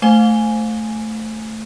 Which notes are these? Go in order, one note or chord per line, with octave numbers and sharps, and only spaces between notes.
A3 C5 G#5 G7